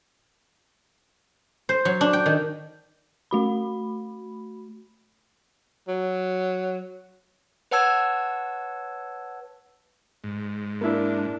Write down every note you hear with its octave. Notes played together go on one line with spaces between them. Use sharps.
C5
F#3
D4
G5
D#3
A3 F#4 B5
F#3
B4 C#5 F#5 A5 E6 G#6
G#2
A#3 D4 E4